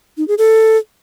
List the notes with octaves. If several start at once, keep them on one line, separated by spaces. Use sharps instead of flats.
D#4
G#4
A4